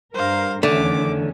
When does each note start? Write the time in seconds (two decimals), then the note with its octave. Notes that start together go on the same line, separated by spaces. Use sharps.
0.14 G2 A#4 C5 F5
0.63 E2 D3 D#3 A3 C#4 D6